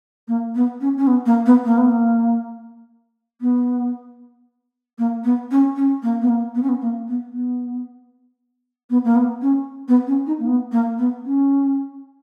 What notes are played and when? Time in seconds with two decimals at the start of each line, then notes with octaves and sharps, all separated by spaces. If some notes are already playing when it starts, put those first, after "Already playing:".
0.28 A#3
0.55 B3
0.81 C#4
0.98 C#4
1.07 B3
1.26 A#3
1.46 B3
1.65 A#3
1.77 B3
1.90 A#3
3.41 B3
4.98 A#3
5.24 B3
5.51 C#4
5.76 C#4
6.03 A#3
6.21 B3
6.29 A#3
6.55 B3
6.63 C#4
6.69 B3
6.81 A#3
7.08 B3
7.33 B3
8.90 B3
9.04 A#3
9.16 B3
9.42 C#4
9.88 B3
10.07 C#4
10.26 D#4
10.40 A#3
10.47 B3
10.72 A#3
10.98 B3
11.25 C#4